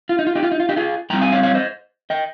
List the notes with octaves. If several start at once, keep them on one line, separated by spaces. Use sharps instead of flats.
F4
D#4
F4
D#4 G4
F4
D#4
F4
D#4 G4
F4 G#4
G2 D#3 G3 C4 G5 A#5
F5 G#5
C#5 F5
C#5 F5
C5 D#5
D#5 G5